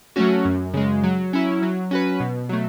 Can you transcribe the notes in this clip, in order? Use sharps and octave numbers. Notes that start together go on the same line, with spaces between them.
F#3 A3 C#4 F#4
F#2
C#3 G#3
F#3
C#4 E4
F#3
C#4 F#4 B4
B2
F#3 A3